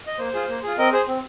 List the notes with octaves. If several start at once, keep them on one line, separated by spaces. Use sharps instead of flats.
D#5
A#3 C5
F4 G#4
A#3
F4 G#4
C4 A#4 D#5
G#4 C5
C4